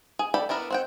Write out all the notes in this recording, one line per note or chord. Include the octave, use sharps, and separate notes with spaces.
G#4
A4 D5 G5 B5
B3 D4 E4 A#4
C4 F#5 G5